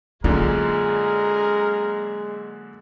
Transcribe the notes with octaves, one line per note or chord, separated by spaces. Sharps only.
F#2 A#2 D3 G#3 F4 A#4